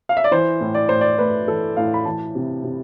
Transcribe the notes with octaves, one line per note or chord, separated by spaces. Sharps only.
F5
E5
D5
E3 C5
A2
D5
A2 C5
D5
A3 B4
E3 A4
A2 F5
B5
E3 A5
C3
C3